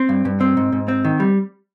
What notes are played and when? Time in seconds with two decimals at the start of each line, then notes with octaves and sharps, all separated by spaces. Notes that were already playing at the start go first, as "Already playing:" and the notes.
Already playing: C4
0.09 G2
0.25 G2
0.41 C4
0.57 G#2
0.73 G#2
0.88 C4
1.05 D#3
1.20 G3